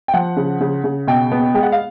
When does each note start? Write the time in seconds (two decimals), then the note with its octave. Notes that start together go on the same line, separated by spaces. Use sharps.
0.08 G5
0.14 F3 F#5
0.37 C#3
0.61 C#3
0.84 C#3
1.07 B2 G5
1.32 B3
1.54 G#3 G5
1.63 F#5
1.72 F5